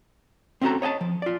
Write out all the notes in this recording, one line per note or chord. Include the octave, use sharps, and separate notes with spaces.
C4 C#4 E4 F#4 A4 A#5
C#5 D#5 G5 A5
F3
F4 D5